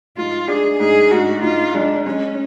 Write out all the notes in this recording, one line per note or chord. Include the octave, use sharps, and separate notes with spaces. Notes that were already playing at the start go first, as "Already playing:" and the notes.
G#2 F4
D4 G#4
G#2 G#4
G#2 F#4
G#2 F4
G#3 D4
G#3 C#4